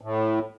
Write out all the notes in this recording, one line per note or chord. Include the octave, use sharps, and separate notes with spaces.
A2